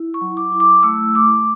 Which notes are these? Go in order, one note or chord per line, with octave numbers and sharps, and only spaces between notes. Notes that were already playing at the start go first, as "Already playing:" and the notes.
Already playing: E4
C#6
F#3
D6
E4
D6
A3 E6
A3 D6